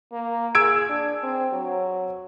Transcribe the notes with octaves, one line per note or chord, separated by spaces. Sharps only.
A#3
G#4 E6 G#6 D7
D4
C4
F#3